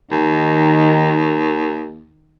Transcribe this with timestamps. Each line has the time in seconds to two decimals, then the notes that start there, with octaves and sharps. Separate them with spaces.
0.11 D#2 D#3